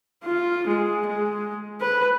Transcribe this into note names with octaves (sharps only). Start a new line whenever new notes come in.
F4
G#3
G#3
B4